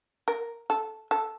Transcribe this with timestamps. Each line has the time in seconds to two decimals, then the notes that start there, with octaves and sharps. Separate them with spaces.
0.28 A#4
0.70 A4
1.11 A4